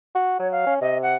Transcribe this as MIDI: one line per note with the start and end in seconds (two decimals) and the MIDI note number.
0.15 0.39 66
0.39 0.66 54
0.39 0.50 73
0.52 0.74 77
0.66 0.77 61
0.81 1.16 48
0.81 0.98 75
1.02 1.14 78